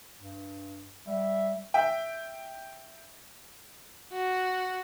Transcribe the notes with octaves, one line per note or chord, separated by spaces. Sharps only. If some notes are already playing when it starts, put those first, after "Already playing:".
G2
G3 E5
E5 G5
F#4